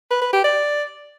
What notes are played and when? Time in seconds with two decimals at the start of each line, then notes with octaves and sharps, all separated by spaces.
0.10 B4
0.21 B4
0.33 G4
0.44 D5